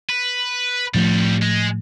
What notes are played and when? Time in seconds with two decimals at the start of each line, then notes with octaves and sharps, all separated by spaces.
0.09 B4
0.94 F2 A2 F3 G3 A3
1.42 G#3